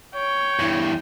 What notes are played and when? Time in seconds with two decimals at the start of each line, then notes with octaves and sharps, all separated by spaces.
0.15 C#5 G5
0.59 E2 G2 E4